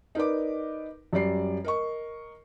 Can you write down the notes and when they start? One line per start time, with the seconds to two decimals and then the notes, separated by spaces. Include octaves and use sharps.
0.15 D#4 A#4 B4 D5 D6
1.13 F#2 G3 D5 C7
1.64 A#4 D#5 C#6